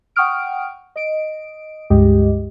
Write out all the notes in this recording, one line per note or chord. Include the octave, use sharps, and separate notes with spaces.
F#5 G5 C#6 D#6 F6 D7
D#5 D7
C#2 G2 G#3 G4 D#5